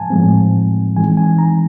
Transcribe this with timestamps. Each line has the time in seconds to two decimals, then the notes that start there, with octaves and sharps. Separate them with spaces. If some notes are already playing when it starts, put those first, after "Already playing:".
Already playing: A2 F3 G#3 C4 F5 G#5 A5
0.10 A2 F3 G#3 C4
0.96 E3 G#3 C4 D#4 G#5
1.17 G#5
1.38 A#5